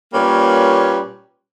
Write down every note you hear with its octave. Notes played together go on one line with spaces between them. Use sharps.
A#2 G3 A#3 C#4 B4 C#5